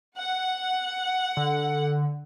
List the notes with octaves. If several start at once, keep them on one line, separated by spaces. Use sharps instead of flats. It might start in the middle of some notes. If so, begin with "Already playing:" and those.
F#5
D3